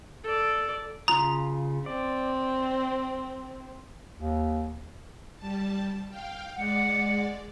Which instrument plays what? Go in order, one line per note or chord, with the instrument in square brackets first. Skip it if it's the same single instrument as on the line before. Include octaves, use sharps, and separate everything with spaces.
[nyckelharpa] A4 D5
[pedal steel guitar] C#3 F4 D#6 [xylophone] A#5
[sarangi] C4 [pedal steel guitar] D5
[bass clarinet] D#2
[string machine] G3 A5
F5 G5
[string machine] G#3 D5 [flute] F#5